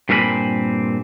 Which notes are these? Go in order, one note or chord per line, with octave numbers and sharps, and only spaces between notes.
G2 A#2 C4 A#4 G#5 B5